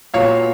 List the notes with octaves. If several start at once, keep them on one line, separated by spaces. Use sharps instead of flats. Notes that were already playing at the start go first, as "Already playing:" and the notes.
A#2 F#3 B3 C#5 F5